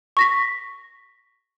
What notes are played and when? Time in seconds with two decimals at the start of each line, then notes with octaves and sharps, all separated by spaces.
0.17 C#6 A#6 B6